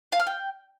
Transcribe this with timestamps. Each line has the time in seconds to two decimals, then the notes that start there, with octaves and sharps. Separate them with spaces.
0.12 F5
0.19 F6
0.27 G5